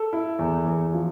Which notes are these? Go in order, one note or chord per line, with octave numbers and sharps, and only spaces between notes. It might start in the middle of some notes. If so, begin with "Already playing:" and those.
Already playing: A4
E4
E2
E2
F3